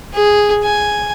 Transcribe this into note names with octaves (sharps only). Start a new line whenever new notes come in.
G#4
G#5